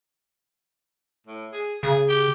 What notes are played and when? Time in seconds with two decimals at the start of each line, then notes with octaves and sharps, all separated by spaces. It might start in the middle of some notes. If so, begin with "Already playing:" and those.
1.27 A2
1.52 G#4
1.83 C#3 G#4
2.09 G4